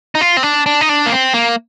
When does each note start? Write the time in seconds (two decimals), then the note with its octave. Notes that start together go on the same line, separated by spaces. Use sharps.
0.15 D#4
0.21 F4
0.37 C4
0.43 D4
0.66 D4
0.81 D#4
0.89 D4
1.06 A#3
1.12 C4
1.34 A#3